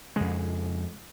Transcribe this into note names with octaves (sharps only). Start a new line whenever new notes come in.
F2 C#3 G#3